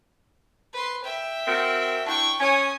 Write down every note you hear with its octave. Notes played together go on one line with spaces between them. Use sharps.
B4 C6
E5 G5
C4 F#4 A#4
D4 E4 G5 C#6
C#4 C#5 G#5 D#6